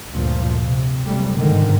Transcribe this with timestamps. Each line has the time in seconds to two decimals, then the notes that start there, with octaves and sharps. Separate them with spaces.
0.11 D2 G2 A#2 F3
0.61 C3
1.06 F#1 C3 G3 A3
1.35 G1 G#2 D3 D#3